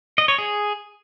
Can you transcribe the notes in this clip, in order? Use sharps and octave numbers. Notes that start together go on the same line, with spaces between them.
D#5
C#5
G#4